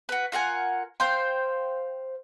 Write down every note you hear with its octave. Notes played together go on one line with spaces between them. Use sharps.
F#4 B4
F4 A#4 F#5 G#5
C5 F5 G5 C6